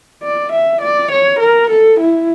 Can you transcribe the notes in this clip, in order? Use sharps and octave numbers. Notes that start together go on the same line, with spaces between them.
D5
E5
D5
C#5
A#4
A4
E4